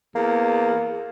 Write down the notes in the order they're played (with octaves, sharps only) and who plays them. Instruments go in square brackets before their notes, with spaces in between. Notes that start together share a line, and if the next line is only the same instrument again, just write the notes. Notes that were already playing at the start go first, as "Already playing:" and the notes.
[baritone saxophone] E2 [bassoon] A#3